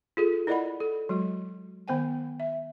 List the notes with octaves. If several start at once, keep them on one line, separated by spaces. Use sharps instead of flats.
F4 G#4 A4
E4 A#4 D5 D#5 F#5 B5
A4
F#3 G#3 F#4
D#3 B3 C5 G5 G#5
E5